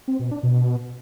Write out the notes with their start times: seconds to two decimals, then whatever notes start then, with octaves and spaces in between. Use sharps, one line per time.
0.08 C4
0.20 B2
0.31 D4
0.43 B2